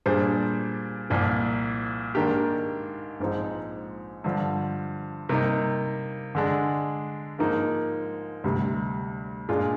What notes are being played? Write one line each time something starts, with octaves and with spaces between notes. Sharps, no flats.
A#2 G3 D4 G#4 C5
C2 A#2 F3
G#2 D#3 A#3 D4 G4
A#1 G#2 F3 C4 D#4
G2 D3 F3
C3 G3 A#3 D#4
D3 G#3 D4
G#2 F3 A#3 D#4
D2 C3 G3
A#2 G#3 D4 F4 G#4